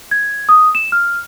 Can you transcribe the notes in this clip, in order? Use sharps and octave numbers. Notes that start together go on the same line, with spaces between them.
G#6
D#6
E7
F6